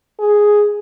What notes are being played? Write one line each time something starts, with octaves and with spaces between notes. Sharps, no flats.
G#4